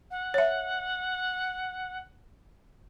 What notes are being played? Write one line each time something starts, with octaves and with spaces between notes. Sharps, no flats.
F#5
C#5 E5